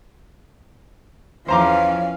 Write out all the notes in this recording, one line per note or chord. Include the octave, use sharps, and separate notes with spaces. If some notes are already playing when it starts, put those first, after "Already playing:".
E2 E3 F3 C#4 C5 F5 A#5 D6